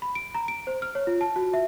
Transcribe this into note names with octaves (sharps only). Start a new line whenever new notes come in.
B5
D7
A#5
D7
C5
F6
C#5
F4
A5
F#4
E5